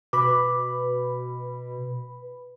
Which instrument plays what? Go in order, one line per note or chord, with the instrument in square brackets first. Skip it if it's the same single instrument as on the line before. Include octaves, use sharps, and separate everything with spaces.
[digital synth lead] B2 [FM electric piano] B4 B5 [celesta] D6